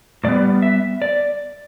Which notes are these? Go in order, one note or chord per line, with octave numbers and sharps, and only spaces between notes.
A2 G3 B3 D5
E5
D5